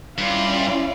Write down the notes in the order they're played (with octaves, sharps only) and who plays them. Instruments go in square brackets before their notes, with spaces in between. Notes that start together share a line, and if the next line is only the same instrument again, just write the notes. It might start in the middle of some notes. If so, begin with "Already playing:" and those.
[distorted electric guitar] G2 [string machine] C#4 E4 [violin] F4 D5